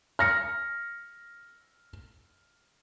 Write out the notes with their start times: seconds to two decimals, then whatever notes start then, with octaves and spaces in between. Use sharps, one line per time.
0.19 F6 A#6 C#7